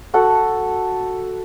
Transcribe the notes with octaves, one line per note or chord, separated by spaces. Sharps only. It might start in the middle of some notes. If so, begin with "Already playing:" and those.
F#4 A4 F#5